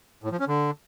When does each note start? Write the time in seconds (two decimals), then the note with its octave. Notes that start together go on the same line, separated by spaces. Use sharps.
0.24 A2
0.32 F3
0.40 C#4
0.48 D3